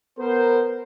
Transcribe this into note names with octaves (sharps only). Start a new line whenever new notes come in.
B3 A#4 C5